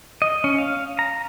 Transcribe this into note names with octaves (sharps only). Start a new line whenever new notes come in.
D#5
C#4
F5
A#5